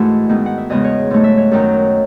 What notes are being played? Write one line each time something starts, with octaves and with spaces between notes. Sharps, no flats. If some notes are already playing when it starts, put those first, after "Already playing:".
Already playing: G#2 E3 A3 E4 F#4 E5 F#5
G#2 D#3 G#3 B3
F#5
E5
E2 C#3 G#3 B3 D#5
C#5
G#2 F#3 A3
E5
C#5
F#2 D#3 F#3